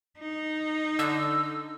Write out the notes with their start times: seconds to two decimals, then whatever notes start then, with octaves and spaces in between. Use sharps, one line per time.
0.19 D#4
0.99 D3 E6